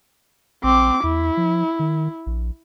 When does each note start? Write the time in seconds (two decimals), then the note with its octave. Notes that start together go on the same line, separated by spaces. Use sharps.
0.64 A#1 C4 D6
1.04 E2 E4
1.37 F3
1.79 D#3
2.26 A#1